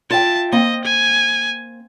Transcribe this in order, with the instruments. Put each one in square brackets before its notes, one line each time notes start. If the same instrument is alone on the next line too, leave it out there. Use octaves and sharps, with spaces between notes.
[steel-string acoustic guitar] F4 E5 G5 [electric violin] A5
[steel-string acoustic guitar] A#3 C4 [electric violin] D#5
[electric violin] G#5